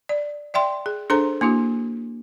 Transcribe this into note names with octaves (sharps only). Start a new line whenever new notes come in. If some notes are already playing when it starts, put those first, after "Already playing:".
D5
D5 E5 G5 C6
G#4
D4 G#4 A4 C5 A#5
A#3 D4 E4 F#4